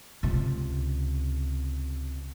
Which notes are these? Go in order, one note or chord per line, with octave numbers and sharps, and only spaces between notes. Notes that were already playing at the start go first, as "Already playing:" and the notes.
C#2 C3